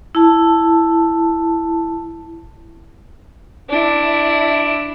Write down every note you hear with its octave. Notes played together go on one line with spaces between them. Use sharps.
E4 A5
D4 E4